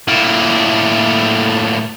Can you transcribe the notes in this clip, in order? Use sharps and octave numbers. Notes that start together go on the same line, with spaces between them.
A2 A#3